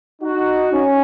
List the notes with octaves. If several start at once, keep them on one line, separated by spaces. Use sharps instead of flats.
D#4 F#4
C#4